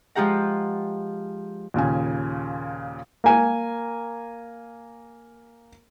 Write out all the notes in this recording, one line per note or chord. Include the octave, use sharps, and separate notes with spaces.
F3 G#3 F4 G4 F#5 A#5
D#2 A#2 C#3 G#5
A#3 G#5